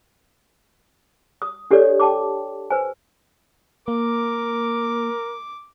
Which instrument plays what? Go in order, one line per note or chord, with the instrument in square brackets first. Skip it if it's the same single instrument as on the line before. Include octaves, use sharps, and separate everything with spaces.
[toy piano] D#6
D4 G4 A4 C#5 D5
G5 A5 D6
B4 C5 G#5
[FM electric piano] A#3 [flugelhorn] A#4 [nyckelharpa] D6